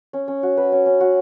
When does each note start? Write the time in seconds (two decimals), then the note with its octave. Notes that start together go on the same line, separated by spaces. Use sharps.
0.13 C#4
0.28 C#4
0.43 F#4
0.57 B4
0.72 C#4
0.86 C#4
1.00 F#4